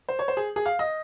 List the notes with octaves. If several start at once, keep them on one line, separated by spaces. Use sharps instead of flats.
C5
C#5
C5
G#4
G#4
F5
D#5